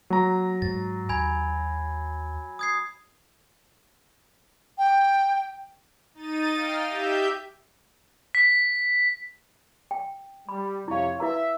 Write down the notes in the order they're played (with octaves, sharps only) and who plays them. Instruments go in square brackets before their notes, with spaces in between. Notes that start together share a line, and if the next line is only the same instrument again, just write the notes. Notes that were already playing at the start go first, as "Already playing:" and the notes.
[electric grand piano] F#3 A#5 [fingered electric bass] A#3
[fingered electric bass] G#2 G#3 [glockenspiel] A6
[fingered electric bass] D#2 [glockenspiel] G#5 B5 G#6
[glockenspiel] D#6 G#6 C7
[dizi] G5
[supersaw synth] D#4 A6 D#7
D#5 F5 G5 F6
G4 E5 G6
[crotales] B6
[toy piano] G5
[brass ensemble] G3 [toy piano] B5
[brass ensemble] F2 C3 C#5 [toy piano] E4 F5
[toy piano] E4 B4 A#5 [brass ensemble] E5